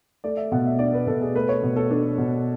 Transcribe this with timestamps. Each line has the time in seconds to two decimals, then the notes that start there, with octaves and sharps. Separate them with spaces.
0.24 A3 D5
0.37 E5
0.52 B2 F#5
0.66 E5
0.79 D4 D5
0.93 B4
1.07 B2 A4
1.22 G#4
1.35 A3 B4
1.49 C#5
1.63 B2
1.76 A4
1.90 D4 A4
2.18 B2